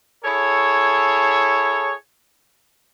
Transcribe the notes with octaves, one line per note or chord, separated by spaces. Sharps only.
E4 G#4 A4 C#5